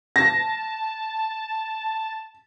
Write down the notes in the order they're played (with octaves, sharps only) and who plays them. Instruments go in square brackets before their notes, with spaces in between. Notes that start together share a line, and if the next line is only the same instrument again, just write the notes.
[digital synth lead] A5 [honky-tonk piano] A#6